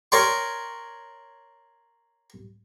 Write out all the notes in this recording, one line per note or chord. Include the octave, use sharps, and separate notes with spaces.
A#4 C#5 D5 G5 C6